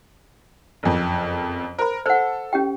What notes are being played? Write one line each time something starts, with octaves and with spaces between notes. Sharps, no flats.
F#1 F2
A#4 C5 B5
A4 C5 F#5
C#4 G4 G5